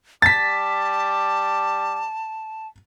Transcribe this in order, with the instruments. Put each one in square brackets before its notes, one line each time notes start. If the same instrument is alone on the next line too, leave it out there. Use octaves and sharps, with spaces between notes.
[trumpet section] G3 D6 [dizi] A5 [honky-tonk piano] A6 B6